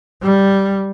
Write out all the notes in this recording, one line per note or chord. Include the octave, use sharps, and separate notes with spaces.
G3